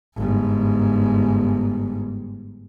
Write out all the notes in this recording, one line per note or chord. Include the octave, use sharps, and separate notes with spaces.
G1 G#2